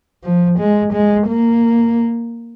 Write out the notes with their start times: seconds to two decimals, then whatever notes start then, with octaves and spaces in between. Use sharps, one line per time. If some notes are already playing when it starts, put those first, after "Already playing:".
0.24 F3
0.58 G#3
0.93 G#3
1.28 A#3